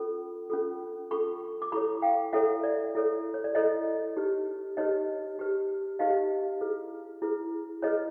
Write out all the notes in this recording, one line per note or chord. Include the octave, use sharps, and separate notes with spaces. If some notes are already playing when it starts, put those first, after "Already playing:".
Already playing: C#4 F4 A4
C#4 F4 A4
C#4 F4 A4 B5 C#6
D6
E4 A4 C#5 B5 C#6
F5 G5
E4 A4 C#5 E5 F#5
D5 E5
E4 A4 C#5
C#5
D5
E4 A4 C#5 D#5
D#4 G4 B4
D#4 G4 B4 C#5 D#5
D#4 G4 B4
D#4 G4 B4 D#5 F5
E4 G#4 B4
E4 G#4 B4
E4 G#4 B4 C#5 D#5